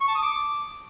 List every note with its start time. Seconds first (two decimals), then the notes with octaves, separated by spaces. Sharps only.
0.01 C#6
0.08 A5
0.15 D#6
0.22 D6